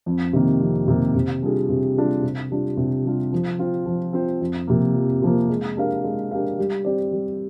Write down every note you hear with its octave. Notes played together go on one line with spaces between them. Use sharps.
F2
C3 D#3 A#3
F2
C3 D#3 A#3
C3
G3 D4 F4 G#4
C3
G3 D4 F4 G#4
C3
G3 D4 F4
C3
G3 D4 F4
F3
C4 F4 C5
F3
C4 F4 C5
F2
C3 F3 A#3
F2
C3 F3 A#3
G#3
D4 G4 A#4 F5
G#3
D4 G4 A#4 F5
G3
C4 G4 D5
G3